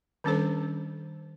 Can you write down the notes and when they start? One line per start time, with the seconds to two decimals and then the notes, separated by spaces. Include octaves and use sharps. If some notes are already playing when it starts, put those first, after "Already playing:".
0.24 D#3 G3 C#4 D4 A4 C5